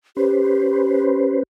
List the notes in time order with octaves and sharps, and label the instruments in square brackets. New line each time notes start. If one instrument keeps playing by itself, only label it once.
[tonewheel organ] C#4 B4 C5 [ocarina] G4